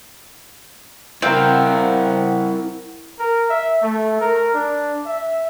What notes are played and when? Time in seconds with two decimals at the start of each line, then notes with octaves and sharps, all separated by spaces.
1.22 C4 E4 A#4 F5 F#5
3.19 A#4
3.50 E5
3.82 A3
4.21 A#4
4.54 D4
5.06 E5